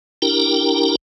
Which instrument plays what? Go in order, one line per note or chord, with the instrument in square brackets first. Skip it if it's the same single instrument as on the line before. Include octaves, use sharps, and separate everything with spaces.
[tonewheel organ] D4 E4 G4 A#4 G5 A#5